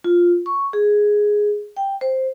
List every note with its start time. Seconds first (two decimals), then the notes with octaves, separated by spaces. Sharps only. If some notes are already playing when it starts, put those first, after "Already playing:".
0.04 F4
0.46 C#6
0.73 G#4
1.77 G5
2.01 C5